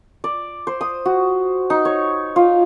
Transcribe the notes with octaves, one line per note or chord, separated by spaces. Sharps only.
D5
C5
D#6
F#4
D#4
C#5
F4